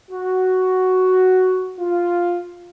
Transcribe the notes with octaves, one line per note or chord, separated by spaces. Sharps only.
F#4
F4